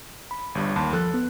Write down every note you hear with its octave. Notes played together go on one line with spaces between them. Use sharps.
B5
G1 G2
D#2 A5 B5 C6
F3 A4 F#6
B3